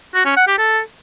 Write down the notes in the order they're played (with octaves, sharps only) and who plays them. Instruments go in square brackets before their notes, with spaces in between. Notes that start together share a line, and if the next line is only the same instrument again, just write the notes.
[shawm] F#4
C#4
F#5
G4
A4